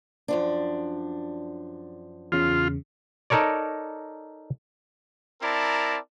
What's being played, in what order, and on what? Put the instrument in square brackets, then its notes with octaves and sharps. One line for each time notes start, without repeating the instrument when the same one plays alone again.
[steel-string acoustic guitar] F#2 F3 D4
[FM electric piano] E2 C#3 [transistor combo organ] F4
[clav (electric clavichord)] D#4 A4 A#4 C#5 D5
[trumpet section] C4 E4 A#4 D5 A5 A#5